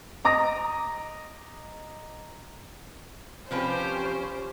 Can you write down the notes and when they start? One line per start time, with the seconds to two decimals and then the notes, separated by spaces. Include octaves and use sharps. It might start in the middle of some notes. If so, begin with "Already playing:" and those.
0.25 D#5 A#5 D6 D#6 A#6
3.51 C3 F3 C#4 G4 B4 C5